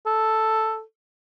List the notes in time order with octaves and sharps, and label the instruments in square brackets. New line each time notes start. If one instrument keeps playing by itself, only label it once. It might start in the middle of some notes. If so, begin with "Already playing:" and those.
[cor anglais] A4